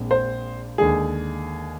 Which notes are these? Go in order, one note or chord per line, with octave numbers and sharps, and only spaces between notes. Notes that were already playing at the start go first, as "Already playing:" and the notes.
Already playing: A#1 A#2 G#3 C4
C5
D#2 D3 G#3 G#4